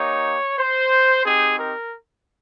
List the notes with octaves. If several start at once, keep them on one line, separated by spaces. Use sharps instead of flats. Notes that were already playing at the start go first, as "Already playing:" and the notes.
Already playing: A#3 D#4 G4 C#5
C5
C4 D#4 G4 G#4
A#4